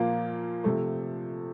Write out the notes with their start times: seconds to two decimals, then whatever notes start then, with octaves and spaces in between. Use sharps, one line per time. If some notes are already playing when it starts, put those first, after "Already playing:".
Already playing: A#2 F3 A#3 F4
0.64 C3 F3 A3